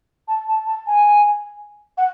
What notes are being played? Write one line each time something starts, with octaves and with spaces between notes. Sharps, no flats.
A5
A5
A5
G#5
F#5